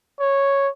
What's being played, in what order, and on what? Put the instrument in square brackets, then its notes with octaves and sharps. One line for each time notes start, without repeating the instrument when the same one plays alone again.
[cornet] C#5